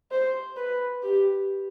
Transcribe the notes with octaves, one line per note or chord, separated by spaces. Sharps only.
C5
B4
G4